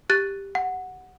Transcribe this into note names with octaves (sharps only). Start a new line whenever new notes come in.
G4 F#6 A6
F#5